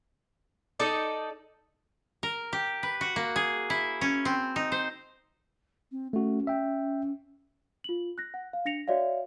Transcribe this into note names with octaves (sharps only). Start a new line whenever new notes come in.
D#4 A4 D5
A#4
G4
B4
F#4
A#3
G#4
E4
C#4
C4
D#4
C5
C4
A3 C#4 F#4
E5 G5
F4 F#7
F#6 A#6
F#5
F5
D4 A#6 C#7 F7
F#4 C#5 D5 E5 F5